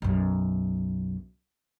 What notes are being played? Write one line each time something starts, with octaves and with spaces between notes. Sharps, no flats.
B1 F#2